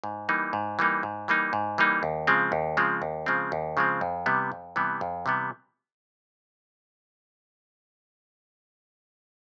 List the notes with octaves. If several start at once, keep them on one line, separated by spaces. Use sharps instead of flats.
G#2
E3 G3 A#3 D#4
G#2
E3 G3 A#3 D#4
G#2
E3 G3 A#3 D#4
G#2
E3 G3 A#3 D#4
D#2
C#3 F3 G#3 C4
D#2
C#3 F3 G#3 C4
D#2
C#3 F3 G#3 C4
D#2
C#3 F3 G#3 C4
F2
C3 E3 G3 B3
F2
C3 E3 G3 B3
F2
C3 E3 G3 B3